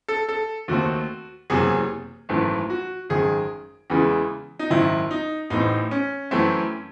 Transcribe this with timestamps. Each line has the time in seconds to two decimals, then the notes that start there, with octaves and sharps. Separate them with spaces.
0.08 A4
0.29 A4
0.68 D#2 D#3 A3 C4 F#4
1.50 F#1 E2 C3 F#3 G#4
2.29 G#1 F#2 E3 A3
2.70 F#4
3.09 G#1 F#2 D#3 G#4
3.90 E2 C#3 E3 G#3
4.59 D#4
4.70 G#1 F#2 D#3 E4
5.11 D#4
5.50 A1 A2 E3 C4 D#4
5.91 C#4
6.31 F#2 E3 A3 C4